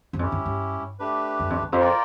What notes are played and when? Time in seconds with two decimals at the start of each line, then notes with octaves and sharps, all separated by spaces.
0.13 F#2
0.19 F2 C#4 E4 G4
0.32 F#2
0.46 G2
0.99 A3 D4 G4 B4
1.40 F#2
1.50 F2
1.62 E2
1.72 F2
1.79 F4 A#4 D5 G5